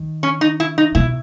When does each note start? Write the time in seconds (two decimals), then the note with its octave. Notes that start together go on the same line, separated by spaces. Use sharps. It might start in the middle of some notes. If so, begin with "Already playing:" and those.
Already playing: D#3
0.23 C#4
0.41 D#4
0.60 E4
0.78 D#4
0.95 B2 E4